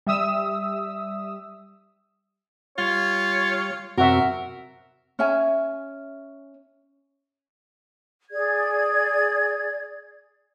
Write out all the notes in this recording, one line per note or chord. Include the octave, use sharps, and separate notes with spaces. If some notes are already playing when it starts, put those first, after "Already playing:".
G3 E5 D#6 E6
G3 F4 C#5
F#2 C3 C4 F#4 A#4 E5
C#4 E5 G#5
G#4 D5 G#6